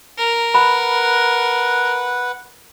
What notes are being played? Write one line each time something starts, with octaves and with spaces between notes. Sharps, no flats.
A#4
B4 F#5 B5